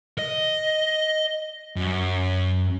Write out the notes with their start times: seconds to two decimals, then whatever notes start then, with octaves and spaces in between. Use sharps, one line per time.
0.19 D#5
1.76 F#2